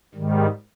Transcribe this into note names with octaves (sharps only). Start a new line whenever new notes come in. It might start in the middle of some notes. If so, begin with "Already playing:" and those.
G#2 D#3 G3